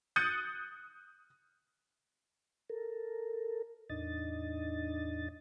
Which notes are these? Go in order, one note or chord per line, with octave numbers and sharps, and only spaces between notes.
D#6 F#6 G6 A6 C#7 D#7
A4 A#4
E2 A2 D4 D#4 D#5 A6